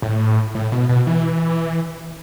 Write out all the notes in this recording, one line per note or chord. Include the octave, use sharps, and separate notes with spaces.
A2
A2
B2
B2
E3